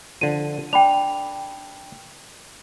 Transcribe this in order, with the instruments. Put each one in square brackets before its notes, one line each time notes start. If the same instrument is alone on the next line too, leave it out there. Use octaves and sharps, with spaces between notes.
[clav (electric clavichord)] D3 F3 [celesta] D#7
[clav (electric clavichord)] D4 [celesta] G5 B5 F7